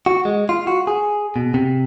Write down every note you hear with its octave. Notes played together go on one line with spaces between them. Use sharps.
F#4
G#3
F4
F#4
G#4
B2
C3